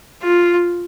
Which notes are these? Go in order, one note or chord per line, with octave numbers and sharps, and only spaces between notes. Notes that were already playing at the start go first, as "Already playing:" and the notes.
F4